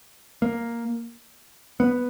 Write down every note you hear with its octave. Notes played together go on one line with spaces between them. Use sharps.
A#3
B3